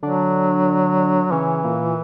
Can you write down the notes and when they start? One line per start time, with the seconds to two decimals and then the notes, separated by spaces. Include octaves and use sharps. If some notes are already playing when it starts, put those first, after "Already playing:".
0.02 D3 F#3 D4
1.31 C#3 E3 C#4
1.64 A#2 A#3